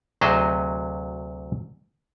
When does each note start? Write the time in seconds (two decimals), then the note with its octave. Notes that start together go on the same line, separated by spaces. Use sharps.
0.21 D2 C3 F#3 G#4 C5 D#5